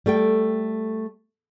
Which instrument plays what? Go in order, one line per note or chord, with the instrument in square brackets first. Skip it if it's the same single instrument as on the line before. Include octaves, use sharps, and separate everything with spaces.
[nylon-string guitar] G3 A3 A4 G5